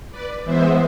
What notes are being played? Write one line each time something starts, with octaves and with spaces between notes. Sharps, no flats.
B4 D5
E3 G#3 B3 C5 E5